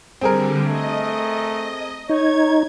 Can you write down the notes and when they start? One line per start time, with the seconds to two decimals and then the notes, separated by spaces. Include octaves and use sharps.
0.21 D3 G3 C4 G#4 A#4
0.67 A3 D#5
2.09 D#4 C#5 G#6